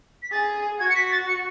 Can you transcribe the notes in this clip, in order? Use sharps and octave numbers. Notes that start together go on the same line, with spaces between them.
B6
G#4 A6
F#4 G#6
C#7
B6
A6
C#7